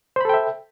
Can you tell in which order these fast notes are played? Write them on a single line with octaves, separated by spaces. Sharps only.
C5 B5 A4 G5 E5